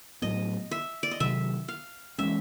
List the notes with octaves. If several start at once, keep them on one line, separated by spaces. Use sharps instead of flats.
A2 F#3 B3 D#5
E5
D5
D#5
C3 D#3 F#3 E5
F5
E3 G#3 C#4 E5